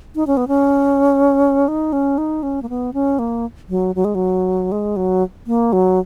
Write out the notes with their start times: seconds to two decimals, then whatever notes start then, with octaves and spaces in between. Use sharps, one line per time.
0.15 D#4
0.27 C#4
0.37 B3
0.48 C#4
1.68 D#4
1.93 C#4
2.18 D#4
2.43 C#4
2.62 A#3
2.69 B3
2.94 C#4
3.19 A#3
3.69 F#3
3.95 F#3
4.04 G#3
4.15 F#3
4.72 G#3
4.96 F#3
5.47 A#3
5.73 F#3